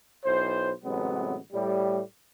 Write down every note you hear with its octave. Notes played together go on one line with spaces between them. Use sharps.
B1 E4 C5
A1 C3 F#3 G#3 B3
A2 G3